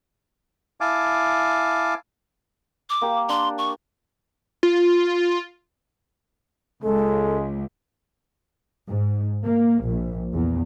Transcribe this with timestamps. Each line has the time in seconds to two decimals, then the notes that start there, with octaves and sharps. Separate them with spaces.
0.81 E4 F5 G#5 A5 D6
2.90 D6
3.01 A#3 G4
3.29 D4 C6
3.58 C#6
4.63 F4
6.83 C#2 G#3 A4
8.89 G#2
9.44 A#3
9.84 A#1
10.33 E2